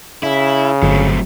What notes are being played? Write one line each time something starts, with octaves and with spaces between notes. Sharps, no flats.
C#3 E4
G1 F#3 A3 C4